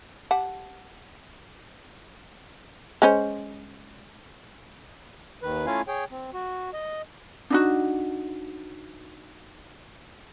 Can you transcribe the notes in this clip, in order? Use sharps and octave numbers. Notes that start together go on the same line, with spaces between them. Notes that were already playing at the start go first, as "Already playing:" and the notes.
G4 F#5 A5
G#3 C#4 C5
D#2 D#3 B4
A3 C#4 E4 F4 F5 G#5
G#4 C#5 G5
C4
F#4
D#5
D4 D#4 F#4